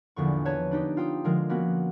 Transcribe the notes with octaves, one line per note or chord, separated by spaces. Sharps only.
A#1 E2 D3 C#6
B4 C#5 A5 G#6
D4 D#4 G4
F4 G5 D#6
D3 F3 G#3 A#4
A#3 B3 C#4 F#4